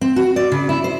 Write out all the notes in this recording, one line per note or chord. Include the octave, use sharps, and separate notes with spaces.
C4
F#4
D5
C#3
E4
C5